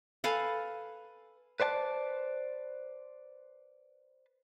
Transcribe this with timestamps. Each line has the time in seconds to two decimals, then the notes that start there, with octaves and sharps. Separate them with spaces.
0.24 A4 B4 F5 G#5
1.60 B4 C5 D5 G#5 A5